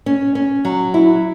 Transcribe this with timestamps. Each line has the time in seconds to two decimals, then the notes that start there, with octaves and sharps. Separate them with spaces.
0.06 C#4
0.35 C#4
0.65 F#3
0.94 E4